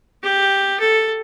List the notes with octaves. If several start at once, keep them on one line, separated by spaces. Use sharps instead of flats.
G4
A4